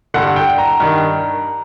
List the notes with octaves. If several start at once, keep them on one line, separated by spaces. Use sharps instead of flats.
G2 D3 F#5
G5
A#5
G2 D#3